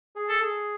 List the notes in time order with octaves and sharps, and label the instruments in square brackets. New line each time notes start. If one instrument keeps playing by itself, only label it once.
[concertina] G#4
[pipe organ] A4
[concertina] G#4